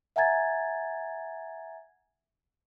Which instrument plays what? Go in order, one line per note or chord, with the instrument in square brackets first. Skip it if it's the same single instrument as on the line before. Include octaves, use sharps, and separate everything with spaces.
[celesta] E5 F#5 G#5 A#5 G#6 A6